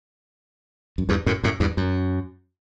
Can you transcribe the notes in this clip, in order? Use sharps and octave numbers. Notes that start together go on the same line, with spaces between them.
F#2
E2 G2
F#2 A2
F#2 A2
E2 G2
F#2